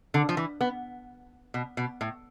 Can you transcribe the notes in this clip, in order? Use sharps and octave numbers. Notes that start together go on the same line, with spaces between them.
D3
F3
E3
B3
B2
B2
A2